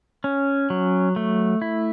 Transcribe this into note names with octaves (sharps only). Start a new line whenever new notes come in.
C#4
F#3
A3
E4